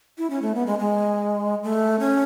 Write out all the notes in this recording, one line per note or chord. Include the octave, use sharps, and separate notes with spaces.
E4
C#4
A3
B3
G#3
G#3
A3
C#4